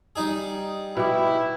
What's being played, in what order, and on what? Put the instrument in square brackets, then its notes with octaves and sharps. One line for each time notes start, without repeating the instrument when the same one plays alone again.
[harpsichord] G3 D#4 G#4
[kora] B2 G4 [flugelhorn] E4